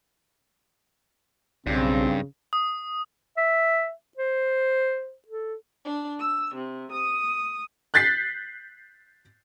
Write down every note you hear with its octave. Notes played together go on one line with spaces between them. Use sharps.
B1 G2 C#3 C4
D#6
E5
C5
A4
D4
E6
C3
D#6
F#6 G6 A6 B6 C7